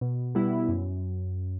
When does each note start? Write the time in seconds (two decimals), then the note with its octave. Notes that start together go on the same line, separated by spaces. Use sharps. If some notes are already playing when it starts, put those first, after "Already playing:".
0.01 B2
0.35 G3 B3 E4
0.69 F#2